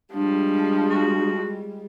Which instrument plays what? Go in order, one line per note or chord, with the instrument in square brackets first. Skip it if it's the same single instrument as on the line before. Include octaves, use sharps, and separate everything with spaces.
[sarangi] F3 [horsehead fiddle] G3 G#3 [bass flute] D4
[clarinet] F#4